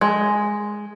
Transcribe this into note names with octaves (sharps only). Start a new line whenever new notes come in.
G#3